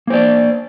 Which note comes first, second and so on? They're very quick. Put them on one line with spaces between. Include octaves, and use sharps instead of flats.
A#3 C5 D5